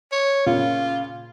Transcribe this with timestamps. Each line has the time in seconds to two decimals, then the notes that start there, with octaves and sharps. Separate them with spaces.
0.12 C#5
0.46 A#2 C#3 F4